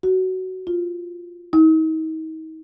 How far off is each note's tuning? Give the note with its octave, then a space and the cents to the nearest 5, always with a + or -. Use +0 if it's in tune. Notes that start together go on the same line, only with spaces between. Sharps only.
F#4 +15
F4 -5
D#4 +40